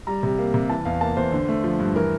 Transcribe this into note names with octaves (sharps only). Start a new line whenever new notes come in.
G3 A#5
C3
A#3
C3
E3 A5
E2 F5
A#3 A5
E2 C5
D3
A3
F3
G2
E3 A#4